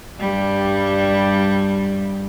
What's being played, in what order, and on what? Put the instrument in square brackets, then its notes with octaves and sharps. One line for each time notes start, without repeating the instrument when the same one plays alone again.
[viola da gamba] G2 G3